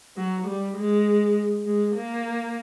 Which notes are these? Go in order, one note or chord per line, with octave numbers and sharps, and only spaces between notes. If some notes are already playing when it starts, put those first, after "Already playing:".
F#3
G3
G#3
G#3
A#3